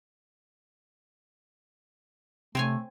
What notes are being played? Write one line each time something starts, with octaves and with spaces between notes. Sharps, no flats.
C3 A3 C4 C#5 G#5